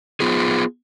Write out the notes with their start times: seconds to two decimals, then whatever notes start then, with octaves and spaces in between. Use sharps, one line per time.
0.20 B3 F4 G#4